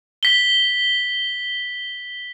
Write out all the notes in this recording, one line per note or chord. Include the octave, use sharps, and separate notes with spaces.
B6 G7